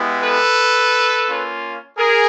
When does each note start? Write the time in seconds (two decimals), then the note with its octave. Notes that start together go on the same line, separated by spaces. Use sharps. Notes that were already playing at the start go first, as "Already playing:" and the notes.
Already playing: G#3 B3 E4 G4
0.22 A4 B4
1.28 A#3 C#4 F4
1.97 G#4 A#4